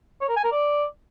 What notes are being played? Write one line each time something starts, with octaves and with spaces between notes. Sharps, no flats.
C#5
A#4
G#5
A#4
D5